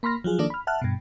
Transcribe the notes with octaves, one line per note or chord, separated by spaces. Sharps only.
A#3 B5 C6 F6 A#6
F3 F#3 F4 G#4
D#3 F3 A#3 D4 A4 D5
B5 F6
E5 F#5 A5 F6 F#6
G2 B2